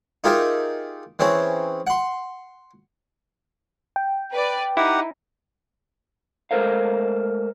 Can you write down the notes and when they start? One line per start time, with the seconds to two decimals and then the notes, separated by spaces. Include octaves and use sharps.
0.24 D#4 F4 G4 G#4 A#4 E5
1.19 E3 C4 C#4 G#4
1.87 F#5 C6
3.96 G5
4.30 B4 D5
4.77 D#4 E4 G4 F#5
6.51 G#3 A3 A4 A#4 C5 F5